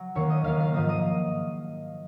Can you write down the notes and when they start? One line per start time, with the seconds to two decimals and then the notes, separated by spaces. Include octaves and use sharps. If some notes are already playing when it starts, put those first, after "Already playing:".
Already playing: F#3
0.15 D#2 D#3 A#3 C#5 C#6
0.30 D#5 D#6
0.44 D#2 D#3 A#3 F5 F6
0.60 F5 F6
0.74 G#2 F3 A#3 D#5 D#6
0.89 D#5 D#6